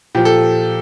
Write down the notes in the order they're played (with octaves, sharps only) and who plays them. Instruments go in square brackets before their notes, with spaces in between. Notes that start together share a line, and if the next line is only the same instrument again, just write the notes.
[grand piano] A#2 F3 G4
A4